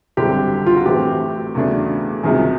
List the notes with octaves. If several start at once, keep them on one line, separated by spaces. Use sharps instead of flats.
G#1 F#2 D3 G3 C4 G4
F4
F#4
A2 E3 A3 C4 G4
E2 C#3 F#3 A3 D4
C#2 C3 D#3 F#3 G#4